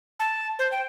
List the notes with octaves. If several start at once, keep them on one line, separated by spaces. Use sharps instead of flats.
A5
C5
G5